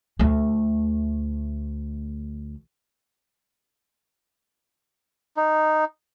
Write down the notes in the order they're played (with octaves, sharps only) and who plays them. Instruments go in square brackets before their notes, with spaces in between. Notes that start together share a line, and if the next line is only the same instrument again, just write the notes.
[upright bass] D2 A3
[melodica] D#4